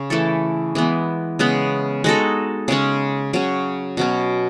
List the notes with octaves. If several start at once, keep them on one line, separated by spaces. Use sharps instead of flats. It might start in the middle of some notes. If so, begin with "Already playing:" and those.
Already playing: C#3 C#4
E3 A3 E4 A4
E3 G#3 B3
C#3 G#3 B3
G#3 D#4 F#4 A4
C#3 G#3 C#4
C#3 F#3 C#4
B2 F#3 C#4